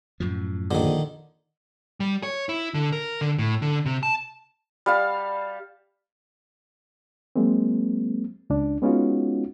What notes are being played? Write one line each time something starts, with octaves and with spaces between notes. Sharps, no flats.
F#2 A2 F3
A#1 D3 D#3
G3
C#5
E4
D3
A#4
D3
A2
D3
C3
A5
G3 F5 A5
F#3 G#3 A#3 C4
C#2 D4
G#3 B3 C#4 D#4 F4 F#4